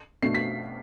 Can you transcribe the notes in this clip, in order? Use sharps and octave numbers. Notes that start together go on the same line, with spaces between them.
B2 A3 D4 C7
B6